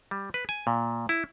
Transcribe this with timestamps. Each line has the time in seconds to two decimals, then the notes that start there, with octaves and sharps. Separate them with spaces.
0.11 G3
0.34 B4
0.49 G#5
0.67 A#2
1.09 E4